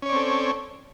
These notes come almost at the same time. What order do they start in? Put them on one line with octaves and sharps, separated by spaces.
C#4 C#5 D5 C4 A4